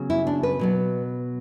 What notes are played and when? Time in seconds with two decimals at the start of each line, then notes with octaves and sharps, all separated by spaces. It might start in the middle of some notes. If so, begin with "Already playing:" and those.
Already playing: C#3 F#3 B3
0.10 E4
0.27 D4
0.43 B4
0.59 B2 F#3 B3